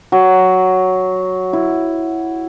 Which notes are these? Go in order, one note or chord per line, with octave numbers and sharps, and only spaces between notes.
F#3
E4